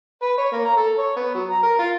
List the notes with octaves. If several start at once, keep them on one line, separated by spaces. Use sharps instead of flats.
B4
C#5
A#3
A#5
A4
C#5
B3
F#3
A#5
A#4
F4